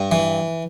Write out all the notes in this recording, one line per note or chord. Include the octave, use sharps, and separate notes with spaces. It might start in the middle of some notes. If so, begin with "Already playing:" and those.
Already playing: G2
E3